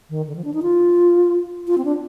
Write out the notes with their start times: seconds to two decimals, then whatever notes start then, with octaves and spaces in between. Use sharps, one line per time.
0.10 D#3
0.27 D3
0.36 F3
0.44 D4
0.54 D#4
0.62 F4
1.68 F4
1.78 C4
1.85 D4